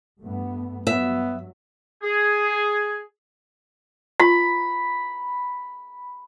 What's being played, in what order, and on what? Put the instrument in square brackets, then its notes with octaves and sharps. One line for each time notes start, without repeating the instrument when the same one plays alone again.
[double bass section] G2 A3 B3
[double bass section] G2 F#3 [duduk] B3 [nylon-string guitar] E5
[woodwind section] G#4
[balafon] F4 [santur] B5